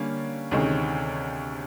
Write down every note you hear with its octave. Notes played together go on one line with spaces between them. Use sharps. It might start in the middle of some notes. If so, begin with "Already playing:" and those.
Already playing: D3 G3 A#3 C#4
D2 C3 D#3 G#3 C#4